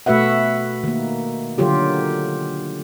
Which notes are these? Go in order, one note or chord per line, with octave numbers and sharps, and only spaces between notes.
B2 A3 F#4 B4 E5 F#5
D#3 A#3
D3 D#3 F#3 F4 G4